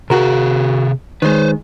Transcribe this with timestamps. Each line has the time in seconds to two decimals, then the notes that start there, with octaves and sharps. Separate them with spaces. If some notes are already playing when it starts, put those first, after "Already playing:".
0.10 C3 F#4 G#4 A#4
1.22 D#3 G#3 B4 C5